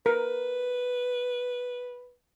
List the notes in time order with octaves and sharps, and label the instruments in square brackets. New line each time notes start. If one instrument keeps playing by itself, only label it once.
[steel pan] A#4 [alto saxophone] B4